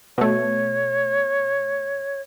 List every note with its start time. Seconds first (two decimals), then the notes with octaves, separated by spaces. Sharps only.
0.18 B2 A3 C#5